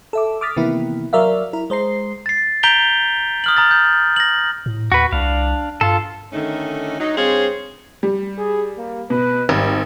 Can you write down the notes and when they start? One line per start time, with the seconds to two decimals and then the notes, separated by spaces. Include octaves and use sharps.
0.13 A4 E5 D6
0.41 D6 D#6 F6 A6 B6
0.57 C3 D#3 E3 A#3 B3 E4
1.13 F#3 A#4 D5 E5 F5
1.53 E4 A#4
1.70 G#3 C5 A#5 C7
2.26 A6 C7
2.63 A#5 G6 B6 D7 F7 G7
3.44 D#6 F6 F#7
3.57 A#5 D#6 A6
3.71 G6
4.16 A#6 F#7
4.66 A2
4.92 D#2 F#4 B4
5.13 C2 D4 F5
5.81 G2 F4 A4
6.32 D3 D#3 A3 C#4 D#4
7.00 F#3 D#4
7.17 G2 C4 G#4 C5 C#5 F5
8.03 G3
8.38 G#4
8.78 A#3
9.10 B2 B4
9.49 G#1 G3